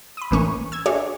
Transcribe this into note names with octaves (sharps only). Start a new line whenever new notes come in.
B5 D#6
A1 E3 A#3 C#4 C#6
E6 G#6
D4 F#4 G#4 C#5 D5 E5